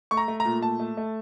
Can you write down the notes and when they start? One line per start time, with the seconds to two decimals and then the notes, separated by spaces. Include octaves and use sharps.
0.11 A3 C#6
0.17 A#5
0.28 A3
0.40 A#5
0.45 A#2
0.62 A3 A5
0.80 A3
0.97 A3